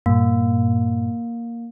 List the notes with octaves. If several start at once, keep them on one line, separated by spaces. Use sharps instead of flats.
G2 A#2 A#3